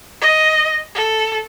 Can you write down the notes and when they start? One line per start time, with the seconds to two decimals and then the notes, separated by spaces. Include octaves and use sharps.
0.21 D#5
0.95 A4